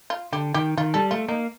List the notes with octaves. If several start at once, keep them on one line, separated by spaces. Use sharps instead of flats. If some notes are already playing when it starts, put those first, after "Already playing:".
F4
D3 G4
D#3 G4
D#3 F4
G3 A4
A3 F4
A#3 D#4